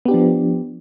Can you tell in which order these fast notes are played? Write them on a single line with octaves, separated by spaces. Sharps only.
B3 G4 D4 F3